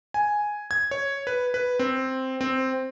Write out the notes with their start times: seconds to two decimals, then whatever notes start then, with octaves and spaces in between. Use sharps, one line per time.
0.14 G#5
0.71 G#6
0.91 C#5
1.27 B4
1.54 B4
1.79 C4
2.41 C4